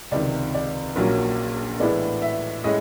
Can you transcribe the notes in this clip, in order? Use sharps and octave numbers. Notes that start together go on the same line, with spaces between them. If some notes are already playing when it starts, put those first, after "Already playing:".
C#2 C3 D#3 D5
D5
A#1 A#2 F#3 A#3 C#4
A2 E3 G#3 B3 D5
E5
A2 G#3 C#4 D#5